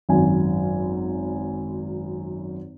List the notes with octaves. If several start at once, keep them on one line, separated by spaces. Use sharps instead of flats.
G#1 F#2 G#5